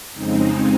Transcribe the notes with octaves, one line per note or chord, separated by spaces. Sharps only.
F2 C#3 G#3 C4 D#4